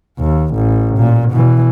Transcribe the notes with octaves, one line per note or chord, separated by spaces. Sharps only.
D#2
A1
A#2
B2 E3